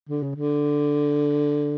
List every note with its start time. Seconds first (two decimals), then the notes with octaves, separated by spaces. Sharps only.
0.09 D3
0.23 C#3
0.36 D3